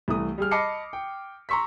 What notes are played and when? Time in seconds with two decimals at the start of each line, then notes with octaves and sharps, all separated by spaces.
0.08 C2 E3 A3 D#6
0.38 G3 G#4 F6
0.51 D#5 A5 B5 D6 C7 C#7
0.93 G5
1.49 A#5 C6 C#6 E6 B6